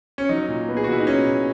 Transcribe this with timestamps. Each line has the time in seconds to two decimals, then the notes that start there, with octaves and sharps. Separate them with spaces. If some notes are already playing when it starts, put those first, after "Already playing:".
0.18 C#4
0.29 F#3 D#4
0.48 A#2
0.68 B3
0.77 G#4
0.84 F#4
0.88 A#2 E4
0.99 D#4
1.07 F#3 C#4
1.27 A#2